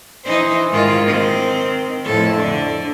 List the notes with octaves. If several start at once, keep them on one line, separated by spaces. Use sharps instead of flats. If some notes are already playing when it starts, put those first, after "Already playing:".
E3 D#4 C5
G#2 D#3 F4
D#3 C4
F2 A2 A4
D3 D4